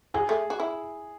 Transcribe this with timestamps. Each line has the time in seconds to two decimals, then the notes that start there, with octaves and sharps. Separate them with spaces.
0.14 F#3 G#4
0.29 A3
0.50 F#4
0.60 E4